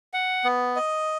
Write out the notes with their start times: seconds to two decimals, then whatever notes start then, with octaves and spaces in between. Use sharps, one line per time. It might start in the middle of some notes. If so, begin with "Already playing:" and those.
0.14 F#5
0.44 B3
0.76 D#5